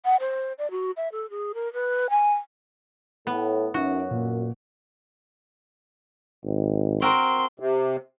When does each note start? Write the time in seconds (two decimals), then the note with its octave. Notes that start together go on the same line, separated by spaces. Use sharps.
0.05 F#5
0.20 C5
0.58 D5
0.71 F#4
0.97 E5
1.12 A4
1.30 G#4
1.55 A#4
1.73 B4
2.10 G#5
3.27 A2 B3
3.74 F#2 C#4 D#4 F#4 E5
4.11 A#2
6.44 G#1
7.02 C4 F#4 A#4 C6
7.60 C3